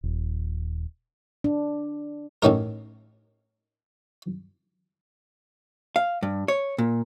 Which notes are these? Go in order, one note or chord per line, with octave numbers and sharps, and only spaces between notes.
D#1
D4
A1 A2 C#4 D#4 A#4
F5
G2
C#5
A#2